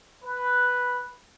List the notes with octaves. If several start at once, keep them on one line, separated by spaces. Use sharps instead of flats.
B4